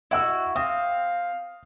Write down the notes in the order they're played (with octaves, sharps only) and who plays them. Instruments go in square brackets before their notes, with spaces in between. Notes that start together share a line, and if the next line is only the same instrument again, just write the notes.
[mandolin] E4 F#4 [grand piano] D#5 F#5 E6
[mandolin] C4 [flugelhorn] F5 [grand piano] D#6